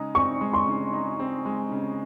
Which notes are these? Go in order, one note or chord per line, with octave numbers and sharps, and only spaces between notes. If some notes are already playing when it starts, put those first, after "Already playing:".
Already playing: C#3 G#3 D#4
C4 C#6
G#3
C6
C#3
D#4
C4
G#3
C#3